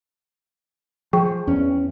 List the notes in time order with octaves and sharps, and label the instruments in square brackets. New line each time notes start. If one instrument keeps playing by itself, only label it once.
[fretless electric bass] F3 [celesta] G#4 G5 C#6
[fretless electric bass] E2 C#4